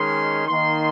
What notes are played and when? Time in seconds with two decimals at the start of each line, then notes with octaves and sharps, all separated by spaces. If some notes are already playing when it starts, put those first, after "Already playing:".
Already playing: D#3 G#3 C#4 C6
0.47 D#3 A#3 D#4 C6